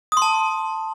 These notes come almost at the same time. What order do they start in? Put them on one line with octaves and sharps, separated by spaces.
D#6 C6 A5